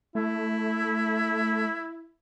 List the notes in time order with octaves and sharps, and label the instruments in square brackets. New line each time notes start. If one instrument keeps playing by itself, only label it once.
[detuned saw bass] A3 [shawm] E4